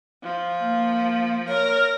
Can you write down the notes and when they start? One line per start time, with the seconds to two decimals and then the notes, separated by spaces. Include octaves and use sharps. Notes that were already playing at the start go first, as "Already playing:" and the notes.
0.23 F3
0.60 A#3
1.48 A#4 C#5